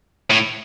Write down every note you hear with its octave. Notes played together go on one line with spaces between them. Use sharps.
A2